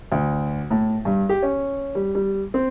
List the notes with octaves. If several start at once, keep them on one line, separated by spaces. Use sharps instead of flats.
D2
A2
G2
G4
C#4
G3
G3
C4